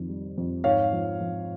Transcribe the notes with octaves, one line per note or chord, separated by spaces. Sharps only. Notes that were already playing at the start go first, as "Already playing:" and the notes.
Already playing: F2 D#3
G3
F2
G#2 C#5 F5
F3
F3